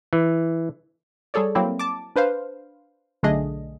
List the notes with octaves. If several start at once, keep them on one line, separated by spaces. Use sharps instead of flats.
E3
G3 G#4 A4 C#5 D5
F#3 A#3 C4 E4
A5 D6
D4 B4 C5 F5
B1 D3 A3 D4 G#4 D#5